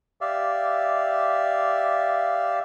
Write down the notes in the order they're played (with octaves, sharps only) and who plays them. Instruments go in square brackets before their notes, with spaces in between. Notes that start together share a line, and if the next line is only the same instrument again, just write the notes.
[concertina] G4 D5 E5 F5